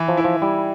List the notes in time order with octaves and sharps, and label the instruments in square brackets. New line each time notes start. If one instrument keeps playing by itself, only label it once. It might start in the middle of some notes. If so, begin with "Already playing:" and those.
Already playing: [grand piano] E3
[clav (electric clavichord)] F3
[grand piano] E4
[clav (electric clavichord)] F3
[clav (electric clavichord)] G3 [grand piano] E4